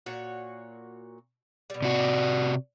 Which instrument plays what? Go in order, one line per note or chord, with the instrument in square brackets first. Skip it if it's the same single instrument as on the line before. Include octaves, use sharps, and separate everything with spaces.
[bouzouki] A#2 F#4 C#5
B2 G3
[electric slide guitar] C3 F#4